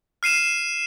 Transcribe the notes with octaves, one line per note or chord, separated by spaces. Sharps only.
F6 C7 D#7 E7